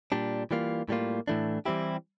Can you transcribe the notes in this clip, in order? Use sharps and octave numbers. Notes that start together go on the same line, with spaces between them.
A#2 G3 D4
E3 G3 A#3 F4
A2 G3 A#3 F4
A2 E3 A3 D4
E3 G3 C4 E4 G4